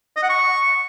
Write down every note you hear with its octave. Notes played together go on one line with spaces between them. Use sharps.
D#5
F#5
C#6